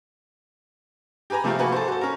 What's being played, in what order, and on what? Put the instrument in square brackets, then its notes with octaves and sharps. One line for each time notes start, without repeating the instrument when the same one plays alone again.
[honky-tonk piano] G4 G#4 B4 G#5 A#5
C3 F3 A3 C4 F4 G4
A#3 F#4 G#4 B4
A4 C5
F#4 A4
C#4 A#4